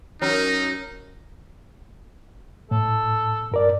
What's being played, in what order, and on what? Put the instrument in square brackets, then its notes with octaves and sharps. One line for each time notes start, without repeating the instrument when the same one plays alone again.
[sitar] F#3 C#4 [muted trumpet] D#4 [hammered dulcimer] A#4
[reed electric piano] A2 [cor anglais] A4
[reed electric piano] G2 A#4 D5